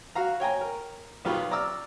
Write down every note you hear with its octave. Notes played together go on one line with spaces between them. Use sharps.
F#4 F5 A#5
C#5 G5 G#5 A#5
A#4
B1 B3 F4 G4 B5 C#6
D5 A#5 D6 E6 F6